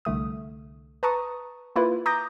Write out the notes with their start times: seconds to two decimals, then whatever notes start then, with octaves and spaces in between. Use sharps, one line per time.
0.05 C2 D3 A3 D#6
1.03 B4 A5 A#5 C#6 D#6
1.76 A#3 E4 F4 B4
2.06 A#5 D6 D#6 G6 A#6